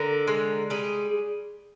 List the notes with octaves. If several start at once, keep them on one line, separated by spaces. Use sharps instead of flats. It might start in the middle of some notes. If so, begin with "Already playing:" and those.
Already playing: D3 A#4
G#3
G3 G#4